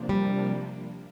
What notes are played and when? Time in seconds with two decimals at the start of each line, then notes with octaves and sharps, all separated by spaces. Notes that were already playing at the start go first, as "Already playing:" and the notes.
Already playing: C3 F3 A#3 D4
0.09 G3